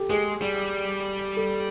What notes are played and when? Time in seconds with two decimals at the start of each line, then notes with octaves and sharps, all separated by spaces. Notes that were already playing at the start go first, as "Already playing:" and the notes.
Already playing: G4 A4
0.10 G#3 G#4
0.42 G3
1.37 A4